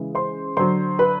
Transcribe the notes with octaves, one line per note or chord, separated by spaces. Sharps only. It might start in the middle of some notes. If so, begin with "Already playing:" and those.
Already playing: C#3 E3 G#3
C5 C6
D3 F#3 C5 C6
B4 B5